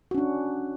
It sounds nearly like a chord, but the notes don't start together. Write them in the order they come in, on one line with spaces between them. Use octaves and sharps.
F#4 C#4 D4